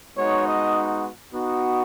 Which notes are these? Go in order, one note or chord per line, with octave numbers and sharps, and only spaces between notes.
G#3 B3 D#4 F#4 C#5
D#5
B3 D#4 F#4